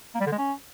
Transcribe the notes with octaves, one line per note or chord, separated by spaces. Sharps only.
A#3
G3
D3
G#3
C#4